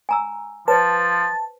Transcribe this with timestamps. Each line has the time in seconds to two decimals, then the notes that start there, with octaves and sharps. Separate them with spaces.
0.09 G#5 A#5 E6
0.68 F3 B4 C5 A5 A6